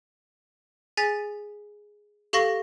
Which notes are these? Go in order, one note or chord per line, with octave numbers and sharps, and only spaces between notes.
G#4 G#5 A6 B6
G4 A4 F5 C#6 A#6 G7